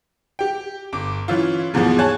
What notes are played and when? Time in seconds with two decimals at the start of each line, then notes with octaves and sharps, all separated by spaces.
0.39 G4 G5
0.93 G1 D6
1.28 E3 C#4 E4 F4
1.74 D#2 G#2 B2 E3 F3 G#3
1.99 C#5 G#5 A5 F#6 G#6